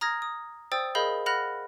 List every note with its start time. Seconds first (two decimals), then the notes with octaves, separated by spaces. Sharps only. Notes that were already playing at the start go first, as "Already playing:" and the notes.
0.01 A#5 D#6 F6 G#6 A#6
0.22 D#6
0.72 C5 D5 G5 D#6 E6 A6
0.95 G#4 A#4 D#5 F5 B5 G6
1.26 F#5 B5 F6 F#6 A#6 F7